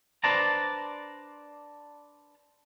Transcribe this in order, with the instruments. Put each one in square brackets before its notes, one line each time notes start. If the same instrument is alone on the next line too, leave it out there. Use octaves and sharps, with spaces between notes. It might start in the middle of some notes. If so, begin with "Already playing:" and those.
[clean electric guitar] D4 B4 C5 D5 A5 A#5